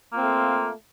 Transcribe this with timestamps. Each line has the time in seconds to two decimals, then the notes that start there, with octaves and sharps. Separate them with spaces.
0.11 A#3
0.14 F4
0.17 C4
0.20 A3